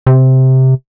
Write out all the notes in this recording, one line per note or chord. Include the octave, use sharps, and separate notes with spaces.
C3